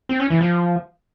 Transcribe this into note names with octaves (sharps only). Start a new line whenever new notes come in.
C4
C#4
E3
F3